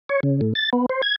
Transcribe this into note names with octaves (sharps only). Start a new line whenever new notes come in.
C#5
C#3
A2
A6
B3
C5
G#6